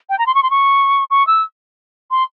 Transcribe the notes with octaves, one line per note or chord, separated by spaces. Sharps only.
G5
A#5
C6
C#6
C6
C#6
C#6
E6
C6